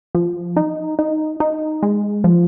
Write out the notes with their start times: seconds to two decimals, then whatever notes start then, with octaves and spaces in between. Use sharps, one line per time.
0.15 F3
0.56 D#4
0.99 D#4
1.40 D#4
1.83 G#3
2.24 F3